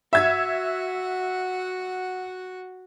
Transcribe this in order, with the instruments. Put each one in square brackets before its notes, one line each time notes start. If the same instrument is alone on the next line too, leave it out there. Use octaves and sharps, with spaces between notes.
[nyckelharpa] F#4 F#5 [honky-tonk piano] E5 G#6